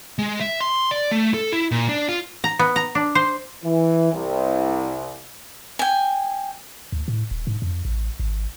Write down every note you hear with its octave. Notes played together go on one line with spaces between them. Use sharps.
G#3
E5
C6
D5
A3
A4
E4
A#2
D4
F4
A#5
B3
A#5
D4
C5
E3
C2
G5 G#5
D2
A2
D#1
G#2
F2
A1
G#1